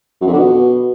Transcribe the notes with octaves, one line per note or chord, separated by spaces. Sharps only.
F#2
F2
D3
B2